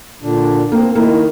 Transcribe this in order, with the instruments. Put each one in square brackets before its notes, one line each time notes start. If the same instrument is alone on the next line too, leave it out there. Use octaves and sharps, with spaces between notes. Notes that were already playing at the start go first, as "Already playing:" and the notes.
[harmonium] A#2 D3 D4
[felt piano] A#3 [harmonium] C4
[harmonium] D#3 [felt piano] A#3 E4